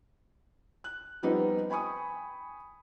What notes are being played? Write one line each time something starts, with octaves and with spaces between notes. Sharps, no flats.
F#6
F3 G3 B3 C4 D#4 G4
G5 G#5 B5 C#6 D#6